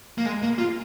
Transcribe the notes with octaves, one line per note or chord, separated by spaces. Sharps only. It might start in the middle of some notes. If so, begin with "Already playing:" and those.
A#3
G#3
A#3
F4